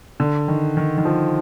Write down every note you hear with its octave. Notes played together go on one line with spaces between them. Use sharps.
D3
D#3
D#3
D#3
F3